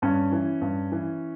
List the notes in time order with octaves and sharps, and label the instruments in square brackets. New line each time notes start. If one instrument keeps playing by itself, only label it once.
[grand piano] G2 C#4
E3
G2
E3